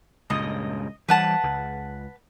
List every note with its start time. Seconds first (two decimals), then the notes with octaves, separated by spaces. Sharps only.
0.30 C#2 G2 A#2 D#5
1.09 E3 G3 B4 F#5 A5
1.43 C#2